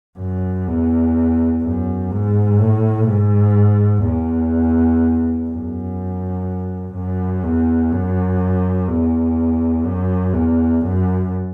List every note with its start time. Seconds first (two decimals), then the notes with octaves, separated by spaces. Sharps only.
0.18 F#2
0.67 E2
1.63 F#2
2.12 G#2
2.60 A2
3.08 G#2
4.05 E2
5.50 F#2
6.94 F#2
7.43 E2
7.91 F#2
8.88 E2
9.84 F#2
10.33 E2
10.81 F#2